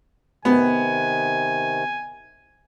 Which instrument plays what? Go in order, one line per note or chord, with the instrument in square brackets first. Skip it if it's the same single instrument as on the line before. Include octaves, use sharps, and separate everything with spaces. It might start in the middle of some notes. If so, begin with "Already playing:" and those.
[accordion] C3 D#3 [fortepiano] B3 [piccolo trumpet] G#5